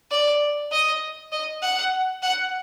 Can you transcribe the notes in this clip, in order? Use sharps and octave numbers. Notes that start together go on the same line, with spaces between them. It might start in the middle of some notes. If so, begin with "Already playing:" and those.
D5
D#5
D#5
F#5
F#5